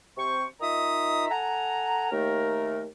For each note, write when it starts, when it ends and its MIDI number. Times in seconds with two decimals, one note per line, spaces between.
0.18 0.45 48
0.18 0.45 72
0.18 0.45 85
0.61 1.27 51
0.61 1.27 63
0.61 1.27 65
0.61 1.27 76
0.61 1.27 82
0.61 1.27 87
1.31 2.09 69
1.31 2.09 78
1.31 2.09 80
1.31 2.09 82
2.12 2.84 39
2.12 2.84 57
2.12 2.84 70